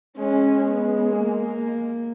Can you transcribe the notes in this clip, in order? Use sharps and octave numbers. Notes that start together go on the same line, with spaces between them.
G#3 C#4
B3
A#3